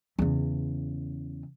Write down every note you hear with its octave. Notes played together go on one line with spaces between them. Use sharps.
E2 C#3